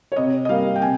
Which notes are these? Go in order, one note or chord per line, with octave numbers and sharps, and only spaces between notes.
C#5
C3 D#5
D#5
G3 A#3 F5
G5
C3 G#5